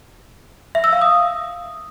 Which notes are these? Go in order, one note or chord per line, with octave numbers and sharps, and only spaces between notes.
E5
E6
F5
D#6